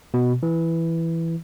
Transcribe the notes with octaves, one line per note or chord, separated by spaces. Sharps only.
B2
E3